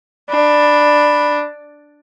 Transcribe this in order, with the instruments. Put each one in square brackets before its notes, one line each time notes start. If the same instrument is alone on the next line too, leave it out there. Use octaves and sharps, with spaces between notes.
[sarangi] D4 [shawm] B5